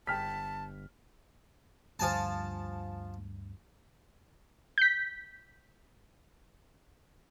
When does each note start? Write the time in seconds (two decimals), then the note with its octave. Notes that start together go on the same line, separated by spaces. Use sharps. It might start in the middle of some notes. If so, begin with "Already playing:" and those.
0.07 G1 G5 A5 F6 B6
1.99 D2 G2 F3 G#5 A5
4.78 G6 B6